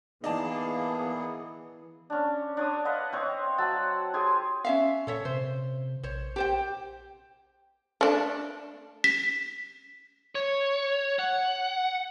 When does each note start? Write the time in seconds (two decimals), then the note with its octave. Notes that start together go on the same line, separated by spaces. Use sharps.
0.24 E3 A#3 B3 D#4 G#4 D5 A5
2.10 C#4 D4
2.57 D4 C#5 D#6
2.85 B4 D#5 F5 F#5
3.12 C4 C5 C#5
3.58 F#3 F#5 A5 E6
4.14 G4 G#4 G#5 C6
4.65 C#4 E5 F5
5.07 A#2 A4 C#5 E5
5.25 C3 C5
6.03 A#1 C5 C#5
6.36 G4 C5 G5
8.01 A3 D4
9.04 B6
10.35 C#5
11.19 F#5